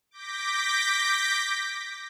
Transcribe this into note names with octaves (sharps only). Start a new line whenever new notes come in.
D6 G6 A#6 B6